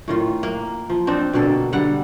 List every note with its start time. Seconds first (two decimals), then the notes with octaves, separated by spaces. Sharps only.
0.08 A2 D#3 F4
0.43 A#3
0.90 F3
1.07 C4 D4 D#4
1.33 B2 D3 A#3 A4
1.73 D3 G3 F#5